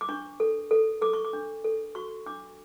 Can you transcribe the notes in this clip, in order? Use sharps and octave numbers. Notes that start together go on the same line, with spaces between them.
D6
D4 C#6
A4
A4
A4 D6
C#6
D6
D4
A4
F#4 C#6
D4 D6